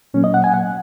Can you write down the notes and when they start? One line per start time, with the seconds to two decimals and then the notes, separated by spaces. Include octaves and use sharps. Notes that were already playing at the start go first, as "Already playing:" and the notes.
0.14 A#2 F#3 A#3 C#4
0.24 D#5
0.34 F#5
0.44 G#5
0.54 F#5